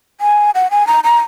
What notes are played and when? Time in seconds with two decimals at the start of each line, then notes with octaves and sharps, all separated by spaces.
0.21 G#5
0.55 F#5
0.71 G#5
0.87 A#5
1.04 A#5